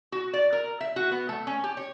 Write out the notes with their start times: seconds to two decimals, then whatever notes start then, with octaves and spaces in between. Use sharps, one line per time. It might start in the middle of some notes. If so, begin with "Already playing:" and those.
0.12 F#4
0.33 D5
0.53 A#4
0.81 E5
0.96 F#4
1.11 B3
1.29 A3
1.47 C#4
1.64 G4
1.77 C#5